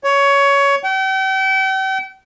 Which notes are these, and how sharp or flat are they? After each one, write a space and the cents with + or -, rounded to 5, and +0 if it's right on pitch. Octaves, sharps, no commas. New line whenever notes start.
C#5 +15
G5 -40